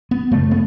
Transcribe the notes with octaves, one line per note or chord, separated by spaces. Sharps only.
B3
F#2 C#3 A3
B3